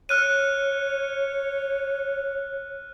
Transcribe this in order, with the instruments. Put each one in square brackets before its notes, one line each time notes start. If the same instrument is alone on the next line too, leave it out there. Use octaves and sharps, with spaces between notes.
[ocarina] C#5 [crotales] F6 F#6 D#7